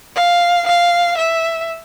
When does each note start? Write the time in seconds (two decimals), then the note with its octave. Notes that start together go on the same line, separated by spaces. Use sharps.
0.16 F5
0.66 F5
1.17 E5